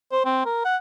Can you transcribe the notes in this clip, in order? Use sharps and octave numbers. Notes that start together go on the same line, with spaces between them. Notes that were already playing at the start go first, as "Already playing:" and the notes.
C5
C4
A#4
F#5